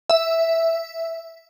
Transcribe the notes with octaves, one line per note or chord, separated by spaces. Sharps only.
E5